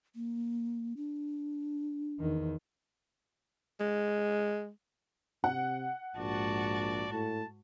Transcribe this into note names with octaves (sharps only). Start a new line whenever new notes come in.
A#3
D4
E2 D#3
G#3
C3 F#5
A#1 G#2 F#4 D5 A5
A2 A5